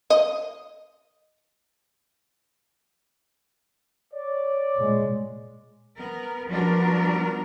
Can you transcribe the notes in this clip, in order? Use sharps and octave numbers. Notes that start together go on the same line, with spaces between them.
D#5
C#5 D5
A#2 G#3
B3 A#4
F3 G3 B3 D4 F#4 A#4